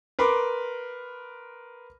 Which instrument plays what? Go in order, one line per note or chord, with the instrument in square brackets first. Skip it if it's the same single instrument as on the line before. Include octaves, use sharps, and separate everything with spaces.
[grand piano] A#4 B4 B5 C6 D6